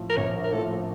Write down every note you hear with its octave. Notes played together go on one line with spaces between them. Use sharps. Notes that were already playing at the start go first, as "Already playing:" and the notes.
Already playing: A2 F3
A#4
A#1 C#5
A#4
A2 F3 A4